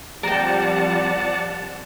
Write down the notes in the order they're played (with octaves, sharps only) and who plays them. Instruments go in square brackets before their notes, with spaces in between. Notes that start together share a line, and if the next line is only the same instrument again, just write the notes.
[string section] F3 G3 C4 [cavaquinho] A#4 G5 [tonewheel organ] D5 F#5 A5